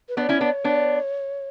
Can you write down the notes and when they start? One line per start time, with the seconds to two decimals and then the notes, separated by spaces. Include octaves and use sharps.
0.09 B4
0.17 B3 D4 D5
0.21 C#5
0.29 C#4 E4
0.41 B3 D4
0.64 B3 D4